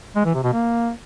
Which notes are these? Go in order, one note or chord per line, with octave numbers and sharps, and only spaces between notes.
G#3
E3
C3
B2
A#3